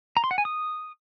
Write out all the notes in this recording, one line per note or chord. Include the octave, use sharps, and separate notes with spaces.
A#5
C6
F#5
G#5
D#6